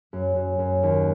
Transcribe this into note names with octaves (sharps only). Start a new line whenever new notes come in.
F#2
F#2
F#2
D#2